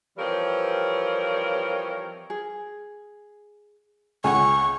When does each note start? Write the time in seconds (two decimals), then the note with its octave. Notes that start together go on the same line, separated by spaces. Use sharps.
0.18 E3 F3 G3 C4 A#4 C#5
2.30 G#4
4.24 C#2 F#5 G#5 C#6